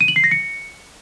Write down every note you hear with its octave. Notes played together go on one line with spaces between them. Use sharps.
D#7
F#7
C7
A#6
C#7